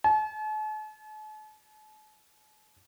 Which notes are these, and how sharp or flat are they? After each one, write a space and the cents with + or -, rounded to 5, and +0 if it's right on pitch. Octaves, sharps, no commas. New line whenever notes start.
A5 -45